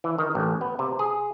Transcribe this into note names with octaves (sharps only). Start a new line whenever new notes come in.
E3
D#3
A1
B3
C3
G#4